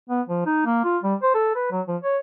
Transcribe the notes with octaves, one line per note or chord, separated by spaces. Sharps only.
B3
F3
D#4
A#3
F4
G3
C5
A4
B4
F#3
F3
C#5